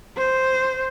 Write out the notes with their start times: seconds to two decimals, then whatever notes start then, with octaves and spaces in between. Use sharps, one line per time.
0.17 C5